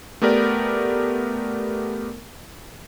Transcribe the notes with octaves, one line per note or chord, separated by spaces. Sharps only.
A3 B3 G4 A#4 D5